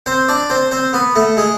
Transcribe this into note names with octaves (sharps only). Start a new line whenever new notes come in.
C4 C5
D4 D5
C4 C5
C4 C5
B3 B4
A3 A4
G#3 G#4